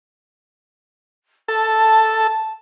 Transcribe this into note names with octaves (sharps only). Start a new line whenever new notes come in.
A4 A5